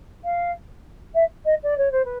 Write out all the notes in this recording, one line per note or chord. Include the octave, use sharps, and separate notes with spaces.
F5
E5
D#5
D5
C#5
C5
B4